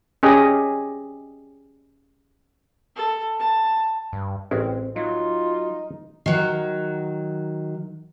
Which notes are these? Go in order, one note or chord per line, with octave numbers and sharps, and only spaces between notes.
C#4 G4 G#4 D#5
A4
A5
G2
A1 G#3 C4 C#4
F#3 D#4 F4
D#3 F#3